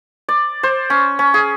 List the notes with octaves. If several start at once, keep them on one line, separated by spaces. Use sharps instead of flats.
D5
C5
C#4
C#4
G#4